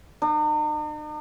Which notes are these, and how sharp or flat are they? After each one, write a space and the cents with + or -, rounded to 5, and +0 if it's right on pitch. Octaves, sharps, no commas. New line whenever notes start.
D#4 -45